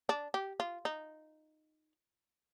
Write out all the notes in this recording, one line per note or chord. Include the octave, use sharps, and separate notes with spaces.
D4
G4
F4
D#4